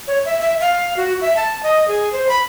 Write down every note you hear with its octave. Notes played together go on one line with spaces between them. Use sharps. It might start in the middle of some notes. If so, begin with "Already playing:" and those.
C#5
E5
E5
F5
F#4
E5
A5
D#5
G#4
C5
B5